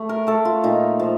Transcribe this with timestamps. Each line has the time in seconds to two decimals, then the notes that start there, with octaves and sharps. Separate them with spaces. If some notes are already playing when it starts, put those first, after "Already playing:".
Already playing: A3
0.09 A#4
0.27 A3 A4
0.45 F4
0.64 A#2 D#4
0.99 F3